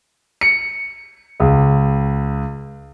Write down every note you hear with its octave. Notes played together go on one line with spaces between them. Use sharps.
C#7
C#2